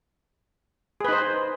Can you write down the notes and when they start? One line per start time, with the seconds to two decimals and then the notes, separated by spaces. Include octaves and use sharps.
1.00 G#4
1.04 B4
1.08 D#4
1.12 C5